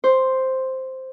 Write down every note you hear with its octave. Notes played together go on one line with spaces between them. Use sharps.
C5